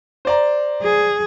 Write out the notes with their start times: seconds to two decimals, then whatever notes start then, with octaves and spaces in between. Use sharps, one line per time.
0.25 C5 D5 A#5
0.83 G#4